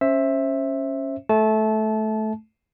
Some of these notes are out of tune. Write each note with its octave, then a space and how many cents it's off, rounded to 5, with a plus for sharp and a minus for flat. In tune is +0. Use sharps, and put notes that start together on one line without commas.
C#4 -10 C5 +20 E5 +0
A3 -15 A5 -25